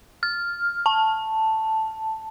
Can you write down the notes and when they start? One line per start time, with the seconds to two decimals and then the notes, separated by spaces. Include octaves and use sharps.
0.23 F6
0.86 A5